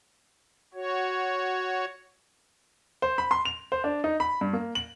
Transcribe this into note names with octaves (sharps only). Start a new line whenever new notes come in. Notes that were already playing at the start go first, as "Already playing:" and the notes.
F#4 C#5
C5
B5
C6
F7
C5
D4
D#4
B5
G2
A#3
F#7